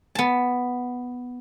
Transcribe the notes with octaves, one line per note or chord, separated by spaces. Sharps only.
B3 A5